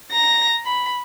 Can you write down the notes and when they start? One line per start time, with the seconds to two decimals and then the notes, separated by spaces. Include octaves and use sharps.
0.12 A#5 A#6
0.65 B5